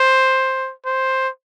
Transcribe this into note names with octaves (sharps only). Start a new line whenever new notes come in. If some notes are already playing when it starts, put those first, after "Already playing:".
Already playing: C5
C5